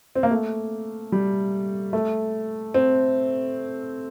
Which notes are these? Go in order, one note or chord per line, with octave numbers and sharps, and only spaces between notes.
C4
A#3
A3
G3
A3
C4